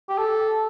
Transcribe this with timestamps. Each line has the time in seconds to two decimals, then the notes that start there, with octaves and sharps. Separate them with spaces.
0.09 G4
0.18 A4